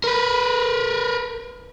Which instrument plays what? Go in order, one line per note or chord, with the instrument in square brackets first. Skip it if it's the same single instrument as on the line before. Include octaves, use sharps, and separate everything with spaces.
[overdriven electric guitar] A#4 B4